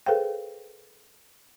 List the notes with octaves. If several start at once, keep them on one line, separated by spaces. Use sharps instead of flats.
G#4 A4 B4 C5 F5 G5